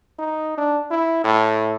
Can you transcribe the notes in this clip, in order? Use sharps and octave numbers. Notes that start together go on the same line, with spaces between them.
D#4
D4
E4
A2